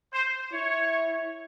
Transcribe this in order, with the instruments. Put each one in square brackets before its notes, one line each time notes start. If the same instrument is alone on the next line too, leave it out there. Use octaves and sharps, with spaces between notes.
[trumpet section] C5
[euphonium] E4 [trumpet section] C#5